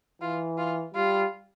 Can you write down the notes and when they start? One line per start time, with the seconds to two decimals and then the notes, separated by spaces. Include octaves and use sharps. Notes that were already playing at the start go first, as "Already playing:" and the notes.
0.21 E3 F4
0.58 F4
0.94 G3 F4